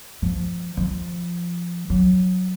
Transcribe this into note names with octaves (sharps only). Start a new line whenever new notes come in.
F3
F3
F#3